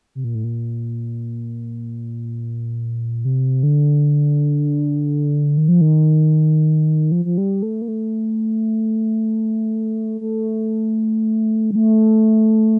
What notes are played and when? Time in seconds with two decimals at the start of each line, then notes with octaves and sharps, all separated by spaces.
0.15 C3
0.24 A#2
0.35 A2
0.44 A#2
3.25 C3
3.63 D3
5.57 D#3
5.68 F3
5.81 D#3
7.12 F3
7.25 F3
7.38 G3
7.62 A3
7.82 A#3
7.88 A3
10.21 A3
11.71 G3
11.75 A3